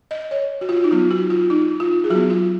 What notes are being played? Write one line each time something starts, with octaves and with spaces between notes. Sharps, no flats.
D#5
C#5
F#4
F4
F#4
D#4
F#3 B3 F4
F#4
F4
D#4
F4
G#4
F#3 B3 F#4
F4